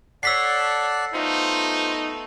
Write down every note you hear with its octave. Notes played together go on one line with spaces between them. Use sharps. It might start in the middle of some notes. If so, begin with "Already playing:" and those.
A4 C#5 D5 F#5 A5 E6 B6 C7
A3 B3 D#4 F4 C5